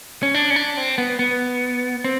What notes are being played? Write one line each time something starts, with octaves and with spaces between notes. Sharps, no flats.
C#4
D4
C#4
D4
C4
B3
B3
C4